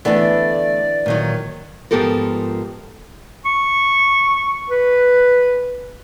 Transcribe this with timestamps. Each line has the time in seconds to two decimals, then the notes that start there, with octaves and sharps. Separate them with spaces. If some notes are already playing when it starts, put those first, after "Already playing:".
0.05 D3 E3 A3 B3 D4 D5
1.06 A#2 D#3 F#3
1.91 G#2 F3 B3 G4 A4 A#4
3.45 C#6
4.69 B4